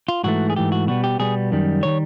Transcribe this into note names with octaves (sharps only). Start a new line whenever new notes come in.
F4
G#2 E3 A3 F#4
G#4
G#2 E3 A3 G4
F#4
B2 G3 B3 F#4
G4
B2 G3 B3 G#4
F#2 D#3 G3
D#3 G3 C#5